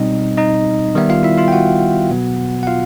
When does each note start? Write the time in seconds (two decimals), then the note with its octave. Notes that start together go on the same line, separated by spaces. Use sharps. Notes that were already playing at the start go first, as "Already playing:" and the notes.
Already playing: B2 G3 C4 D#4 D#5
0.38 D#4 D#5
0.95 D#3 G3 B3 E5
1.09 F4 F5
1.23 E4 E5
1.38 F4 F5
1.48 G5
1.52 F#4 F#5
2.10 B2 F#3 B3
2.63 F#5
2.67 F4 F5